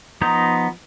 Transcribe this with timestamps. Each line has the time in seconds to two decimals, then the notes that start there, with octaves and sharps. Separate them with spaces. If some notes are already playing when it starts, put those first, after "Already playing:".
0.21 F3 B3 D#4 A#5 G6